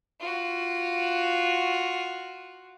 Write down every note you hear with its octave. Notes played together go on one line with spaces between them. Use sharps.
F4 F#4